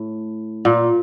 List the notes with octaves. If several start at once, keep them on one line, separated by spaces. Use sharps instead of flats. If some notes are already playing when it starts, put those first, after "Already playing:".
Already playing: A2
A#2